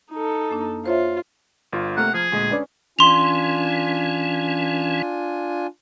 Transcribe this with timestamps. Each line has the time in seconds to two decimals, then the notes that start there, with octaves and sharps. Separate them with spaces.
0.11 D#4 A4
0.49 F#2 A#3 D4
0.86 F4 C5 C#5 E5
1.73 G1 F4
1.97 C3 A3 A#3 F#5 A#5 F6
2.14 F3 G#4
2.32 D2 A#2 G#3 D#5
2.51 C#4 D4 B4 D5
2.99 E3 C#4 D4 F4 G#5 C6 F7